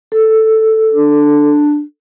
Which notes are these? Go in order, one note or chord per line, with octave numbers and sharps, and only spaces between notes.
A4
D4